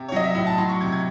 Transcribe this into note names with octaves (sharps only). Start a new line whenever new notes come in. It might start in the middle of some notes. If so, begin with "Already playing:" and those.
Already playing: C3
C#5
F#3 D#5
E5
A2 E5
A5
F#3 C6
C#6
C3 G#6
G#6